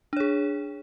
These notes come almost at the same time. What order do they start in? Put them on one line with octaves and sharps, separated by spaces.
D4 C#5 G#4